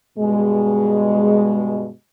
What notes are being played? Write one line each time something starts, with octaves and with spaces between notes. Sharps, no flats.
G2 B2 G#3